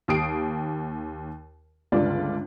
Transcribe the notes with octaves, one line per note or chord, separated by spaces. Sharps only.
D#2 G4 D#6 C7 D7
G1 C#2 D3 F4 D5